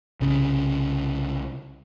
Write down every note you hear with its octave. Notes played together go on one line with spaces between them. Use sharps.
C2 C#3